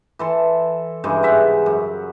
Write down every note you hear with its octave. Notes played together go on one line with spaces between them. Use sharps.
E3 A4 C6
G2 C#3 E3 G#3
G#2 E5 F#5
F#2